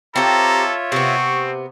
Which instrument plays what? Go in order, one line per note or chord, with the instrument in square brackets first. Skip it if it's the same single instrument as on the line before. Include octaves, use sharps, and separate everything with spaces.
[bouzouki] C4 G4 [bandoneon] F4 C#5 E5 [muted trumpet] A4 [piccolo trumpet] A#5
[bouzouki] C3 B3 [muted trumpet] C4 [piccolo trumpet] C#6